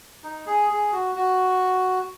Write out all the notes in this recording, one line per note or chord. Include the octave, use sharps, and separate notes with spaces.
D#4
G#4
G#4
F#4
F#4